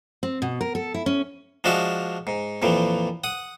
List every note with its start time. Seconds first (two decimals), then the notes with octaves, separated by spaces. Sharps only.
0.23 C4
0.42 B2
0.61 A#4
0.75 A4
0.94 E4
1.06 C#4
1.64 F3 G#3 D4 F#4 E5 F5
2.27 G#2
2.62 F2 A#2 E3 F3
3.24 F#5 D#6